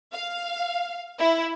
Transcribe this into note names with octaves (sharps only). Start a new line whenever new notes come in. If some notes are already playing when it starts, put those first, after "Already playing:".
F5
E4